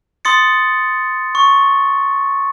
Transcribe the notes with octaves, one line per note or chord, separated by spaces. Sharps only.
C6 D#6 A6 C#7
C#6